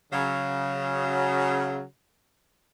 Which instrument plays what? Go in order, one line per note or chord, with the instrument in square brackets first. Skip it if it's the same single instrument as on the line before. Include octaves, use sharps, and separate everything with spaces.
[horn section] C#3 F#3